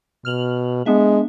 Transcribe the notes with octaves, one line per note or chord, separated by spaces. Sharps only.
B2 F6 F7 F#7
G#3 B3 D4 E5